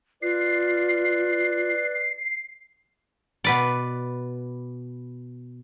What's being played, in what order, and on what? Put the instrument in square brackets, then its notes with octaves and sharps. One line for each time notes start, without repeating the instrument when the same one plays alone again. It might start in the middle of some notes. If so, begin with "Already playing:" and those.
[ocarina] F4 [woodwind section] B4 D5 [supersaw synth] C7
[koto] B2 B4 D5